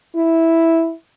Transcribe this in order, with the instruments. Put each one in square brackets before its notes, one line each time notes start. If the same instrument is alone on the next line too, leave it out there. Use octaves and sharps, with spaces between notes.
[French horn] E4